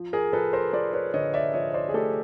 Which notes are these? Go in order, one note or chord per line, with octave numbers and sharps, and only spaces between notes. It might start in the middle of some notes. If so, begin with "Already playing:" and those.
Already playing: F3
G#4 A#4
F3 A4 B4
A#4 C5
F3 C5 D5
B4 C#5
D3 C#5 D#5
D5 E5
F3 C#5 D#5
C5 D5
G#4
A3 G4 A4